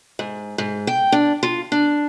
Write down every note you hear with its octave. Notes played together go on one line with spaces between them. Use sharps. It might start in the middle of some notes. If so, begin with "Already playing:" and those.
G#2
G#2
G5
D4
F4
D4